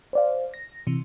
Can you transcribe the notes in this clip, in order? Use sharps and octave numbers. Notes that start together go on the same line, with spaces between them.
C5 D5 F5
A#6
C3 E3